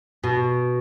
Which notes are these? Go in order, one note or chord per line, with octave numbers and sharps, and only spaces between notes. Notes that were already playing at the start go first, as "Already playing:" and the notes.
B2